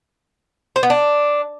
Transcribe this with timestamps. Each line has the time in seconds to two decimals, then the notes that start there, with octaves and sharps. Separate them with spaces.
0.76 C5
0.83 B3
0.90 D4